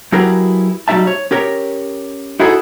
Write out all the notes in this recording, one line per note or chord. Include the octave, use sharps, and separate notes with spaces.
F#3 E4 G4 G#4 A#4 B4
F#3 G3 D#4 E5 A5
C#5
C#4 G4 A#4 C#5
D#4 E4 F#4 G#4 A4 B4